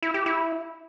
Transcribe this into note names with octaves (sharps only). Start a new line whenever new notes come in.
E4
G4
E4